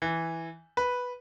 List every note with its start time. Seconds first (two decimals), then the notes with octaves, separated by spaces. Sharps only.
0.02 E3
0.77 B4